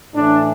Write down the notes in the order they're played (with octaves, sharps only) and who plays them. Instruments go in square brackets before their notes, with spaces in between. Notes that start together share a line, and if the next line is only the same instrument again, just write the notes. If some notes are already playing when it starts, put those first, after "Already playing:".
[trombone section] A2 E3 D4